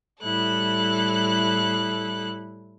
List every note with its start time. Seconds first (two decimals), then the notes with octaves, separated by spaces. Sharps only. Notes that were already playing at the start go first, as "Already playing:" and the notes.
0.23 A2 G3 E4 A4 F#6